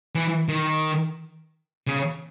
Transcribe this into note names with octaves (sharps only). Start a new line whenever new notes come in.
E3
D#3
C#3